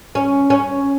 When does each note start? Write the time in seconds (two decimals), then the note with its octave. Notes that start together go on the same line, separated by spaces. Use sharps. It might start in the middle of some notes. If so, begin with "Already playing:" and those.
0.15 C#4
0.50 C#4